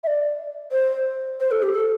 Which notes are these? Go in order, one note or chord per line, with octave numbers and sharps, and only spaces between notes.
E5
D5
C5
C5
A4
G4
A4